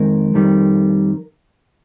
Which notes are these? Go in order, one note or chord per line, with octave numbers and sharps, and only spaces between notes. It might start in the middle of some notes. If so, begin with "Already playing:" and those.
Already playing: F2 D#3 G#3 A#4
F2 D#3 G3